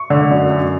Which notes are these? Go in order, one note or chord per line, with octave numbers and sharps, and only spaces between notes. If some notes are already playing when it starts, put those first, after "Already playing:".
Already playing: C#6
D3
F#2
F#2